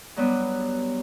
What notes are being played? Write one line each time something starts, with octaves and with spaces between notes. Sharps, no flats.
G2 F#3 G3 B3